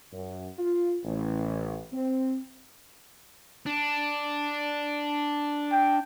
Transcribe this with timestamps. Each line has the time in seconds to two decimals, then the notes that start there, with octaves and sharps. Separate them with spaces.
0.12 F#2
0.58 F4
1.04 A1
1.93 C4
3.66 D4
5.72 G5